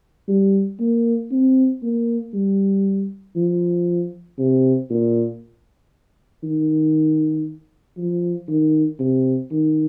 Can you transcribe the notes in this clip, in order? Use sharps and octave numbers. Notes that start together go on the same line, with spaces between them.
G3
A#3
C4
A#3
G3
F3
C3
A#2
D#3
F3
D#3
C3
D#3